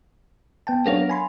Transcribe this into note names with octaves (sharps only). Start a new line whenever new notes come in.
B3 G5 A5
F#3 B3 D4 A#4 C#5 F5
G#5 B5 C6